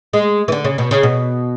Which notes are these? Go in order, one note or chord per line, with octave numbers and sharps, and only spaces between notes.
G#3
E3
D3
C#3
B2
C#3
B2